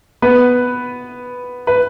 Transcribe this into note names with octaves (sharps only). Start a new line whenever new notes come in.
B3 B4
B4